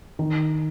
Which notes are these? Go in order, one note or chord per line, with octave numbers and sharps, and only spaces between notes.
D#3